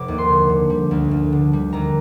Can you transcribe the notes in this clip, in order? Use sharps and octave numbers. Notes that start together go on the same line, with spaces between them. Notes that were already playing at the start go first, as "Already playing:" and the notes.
Already playing: F1 D6
D#2
C6
D3
D3
G3
D2
D2
D3
G3
D#2 A#5